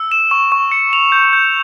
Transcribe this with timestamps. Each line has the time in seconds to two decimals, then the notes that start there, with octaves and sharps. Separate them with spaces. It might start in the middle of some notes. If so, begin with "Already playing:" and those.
Already playing: E6
0.12 E7
0.31 C#6
0.52 C#6
0.72 C#7
0.93 F7
1.12 G6
1.33 G6